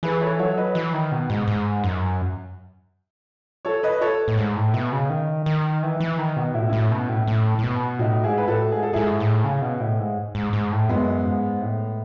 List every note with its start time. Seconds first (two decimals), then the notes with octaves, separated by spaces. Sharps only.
0.03 E3 G#4 B4
0.21 A4 C#5
0.39 F#3 A4 C#5
0.57 B4 D#5
0.75 E3
0.94 D#3
1.12 B2
1.30 G#2
1.48 G#2
1.84 F#2
3.65 A4 C#5
3.83 B4 D#5
4.01 A4 C#5
4.28 A2
4.38 G#2
4.56 A2
4.74 B2
4.92 C#3
5.09 D#3
5.46 D#3
5.83 E3
6.00 E3
6.18 D#3
6.36 B2
6.54 A2 E4
6.62 F#4
6.69 A2 C#4 E4
6.92 B2
7.09 A2
7.27 A2
7.59 A2
7.63 B2
7.99 A2 D#4 F#4
8.24 G#2 E4 G#4
8.38 B4
8.47 A2 F#4 A4
8.72 G#2 G#4
8.83 A4
8.93 G#2 E4 G#4
9.20 A2
9.44 C#3
9.62 B2
9.80 A2
9.99 G#2
10.35 G#2
10.53 G#2
10.72 A2
10.89 F#2 G#3 B3
11.25 G#2
11.61 A2